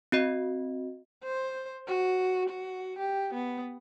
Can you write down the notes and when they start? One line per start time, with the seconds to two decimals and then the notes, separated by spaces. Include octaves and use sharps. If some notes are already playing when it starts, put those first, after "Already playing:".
0.12 C4 F#4 D#5
1.24 C5
1.88 F#4
2.50 F#4
2.99 G4
3.34 B3